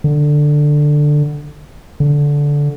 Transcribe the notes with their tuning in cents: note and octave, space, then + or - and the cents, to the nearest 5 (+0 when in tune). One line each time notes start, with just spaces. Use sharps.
D3 +10
D3 -15